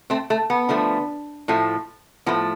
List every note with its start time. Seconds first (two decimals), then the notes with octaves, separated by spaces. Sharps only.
0.10 A3 C4
0.30 A3
0.50 B3
0.69 D3 F3 A3
1.48 A2 F3 A3
2.26 A2 F3 A3 B3